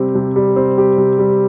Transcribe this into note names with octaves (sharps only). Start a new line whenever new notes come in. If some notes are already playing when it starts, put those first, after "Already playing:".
Already playing: C3 G3 C4 G4
C3
G3
C4
G4
C3
G3